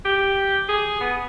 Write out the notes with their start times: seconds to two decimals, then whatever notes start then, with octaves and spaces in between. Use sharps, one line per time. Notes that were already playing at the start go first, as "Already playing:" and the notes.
0.05 G4
0.69 G#4
1.01 B3